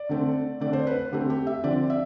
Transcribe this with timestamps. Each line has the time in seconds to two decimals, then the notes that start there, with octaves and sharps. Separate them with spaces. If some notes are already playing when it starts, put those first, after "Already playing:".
Already playing: D5
0.09 D3 A3 C4
0.61 D3 A3 C4 D5
0.73 C5
0.87 B4
0.99 B4
1.12 D3 A3 C4 G4
1.30 G4
1.47 E5
1.64 D3 F3 C4 D5
1.90 E5